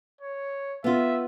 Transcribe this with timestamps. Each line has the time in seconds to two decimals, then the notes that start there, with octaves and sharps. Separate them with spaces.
0.21 C#5
0.84 B3 F4 E5